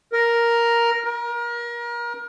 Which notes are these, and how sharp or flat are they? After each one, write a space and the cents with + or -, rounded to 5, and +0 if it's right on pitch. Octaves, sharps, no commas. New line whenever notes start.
A#4 +5
A#4 +30